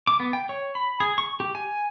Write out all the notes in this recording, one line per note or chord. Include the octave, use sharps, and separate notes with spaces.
D6
B3
G5
C#5
B5
G#4
C#6
G4
G#5